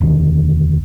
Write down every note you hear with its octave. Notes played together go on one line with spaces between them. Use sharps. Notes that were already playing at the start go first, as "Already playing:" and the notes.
E1 D2 D#3